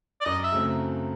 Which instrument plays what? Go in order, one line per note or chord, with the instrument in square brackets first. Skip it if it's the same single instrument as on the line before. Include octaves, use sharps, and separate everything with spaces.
[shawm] D5
[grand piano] F#2 [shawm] D#5
[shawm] E5
[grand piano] C#3 F#3 A3 C4